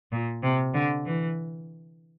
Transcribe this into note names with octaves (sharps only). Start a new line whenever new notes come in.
A#2
C3
D3
E3